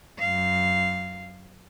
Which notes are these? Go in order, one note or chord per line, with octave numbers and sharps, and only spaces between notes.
F#2 F5